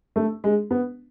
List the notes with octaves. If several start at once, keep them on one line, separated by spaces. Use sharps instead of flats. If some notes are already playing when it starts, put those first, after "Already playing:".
A3
G#3
B3